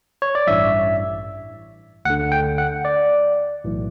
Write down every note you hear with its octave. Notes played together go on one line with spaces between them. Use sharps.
C#5
D5
A1 G2 E3 E5
D2 D3 F#5
G5
F#5
D5
B1 A2 E3